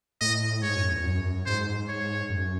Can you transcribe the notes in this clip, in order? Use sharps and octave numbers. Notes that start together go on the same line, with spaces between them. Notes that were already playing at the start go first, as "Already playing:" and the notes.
A2 D#5
G#2 C#5
F#2
E2
F#2
G#2 C5
C#5
F#2